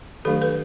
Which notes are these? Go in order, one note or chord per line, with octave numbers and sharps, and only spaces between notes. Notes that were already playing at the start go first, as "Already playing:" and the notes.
D#3 F#3 A3 D4 G4 A4
A4 B4